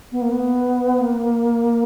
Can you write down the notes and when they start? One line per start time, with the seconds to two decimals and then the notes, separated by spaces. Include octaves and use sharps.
0.12 B3
0.22 A#3
0.32 B3
1.00 A#3